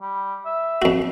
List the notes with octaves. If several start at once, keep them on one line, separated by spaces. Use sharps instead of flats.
G3
E5
F2 F#4